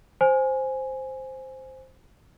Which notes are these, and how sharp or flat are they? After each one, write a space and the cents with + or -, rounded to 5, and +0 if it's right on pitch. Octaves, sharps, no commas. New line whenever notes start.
C5 +0 G#5 +0